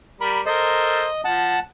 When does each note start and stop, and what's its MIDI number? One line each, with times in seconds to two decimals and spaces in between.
0.21 0.41 55
0.21 0.41 70
0.21 0.41 83
0.46 1.06 69
0.46 1.06 70
0.46 1.06 72
0.46 1.21 75
1.25 1.56 53
1.25 1.59 78
1.25 1.59 81